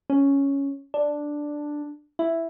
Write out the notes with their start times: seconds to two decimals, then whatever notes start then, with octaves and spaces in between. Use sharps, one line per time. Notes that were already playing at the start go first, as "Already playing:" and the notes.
0.10 C#4
0.94 D4
2.19 E4